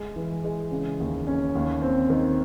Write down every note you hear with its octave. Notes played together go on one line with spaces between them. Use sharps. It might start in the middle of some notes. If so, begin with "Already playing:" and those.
Already playing: G#3
E3
G#3
C#3
D#2
C#4
D#2
C4
D#3